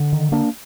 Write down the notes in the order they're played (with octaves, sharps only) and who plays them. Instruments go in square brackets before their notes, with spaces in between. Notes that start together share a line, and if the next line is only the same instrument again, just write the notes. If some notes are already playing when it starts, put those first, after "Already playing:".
Already playing: [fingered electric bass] D3
D#3
A#3 D4